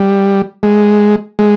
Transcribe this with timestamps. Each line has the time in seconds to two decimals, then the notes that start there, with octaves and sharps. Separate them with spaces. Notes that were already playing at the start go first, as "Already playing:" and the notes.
Already playing: G3
0.63 G#3
1.39 G#3